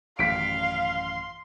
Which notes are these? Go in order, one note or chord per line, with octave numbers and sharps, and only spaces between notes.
A1 F#2 D#3 F5 C6 B6 D7